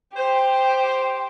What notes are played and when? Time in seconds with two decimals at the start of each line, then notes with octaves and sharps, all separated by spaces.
0.17 G4 C5